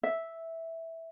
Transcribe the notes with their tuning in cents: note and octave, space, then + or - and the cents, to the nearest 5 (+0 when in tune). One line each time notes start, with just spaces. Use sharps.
E5 -5